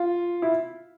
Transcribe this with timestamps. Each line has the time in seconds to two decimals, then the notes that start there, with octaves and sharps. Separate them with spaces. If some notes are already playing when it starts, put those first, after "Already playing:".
Already playing: F4
0.42 E4